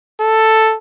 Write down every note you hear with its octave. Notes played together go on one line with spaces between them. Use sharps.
A4